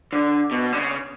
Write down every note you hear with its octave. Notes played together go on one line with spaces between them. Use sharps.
D3
B2
D3
C#3